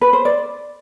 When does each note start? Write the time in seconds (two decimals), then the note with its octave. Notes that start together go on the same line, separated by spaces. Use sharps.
0.01 B4
0.13 C5
0.25 D5